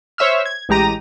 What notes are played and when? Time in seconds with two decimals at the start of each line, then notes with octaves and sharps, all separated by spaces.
0.18 C5 C#5 E5 E6 F6
0.46 G#6
0.69 A1 G#3 G4 A#5 A#6 D#7